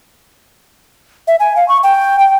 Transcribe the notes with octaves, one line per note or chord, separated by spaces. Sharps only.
E5
G#5
F5
C#6
G5
G5